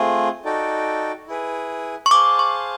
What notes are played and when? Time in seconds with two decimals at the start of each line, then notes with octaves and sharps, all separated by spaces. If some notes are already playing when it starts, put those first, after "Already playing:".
Already playing: A3 C4 F4 G#4
0.45 D#4 F#4 A4 D5 G5
1.28 E4 G#4 B4
2.06 C#6
2.11 G#4 C5 F5 A5 D6
2.39 C#6